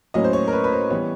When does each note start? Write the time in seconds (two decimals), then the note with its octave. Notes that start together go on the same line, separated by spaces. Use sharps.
0.14 A2 F#3 A#3 C#4 D#5
0.24 C5
0.33 C#5
0.48 A#4
0.53 B4
0.64 B4
0.72 C5
0.91 E3 G3 B3 C#5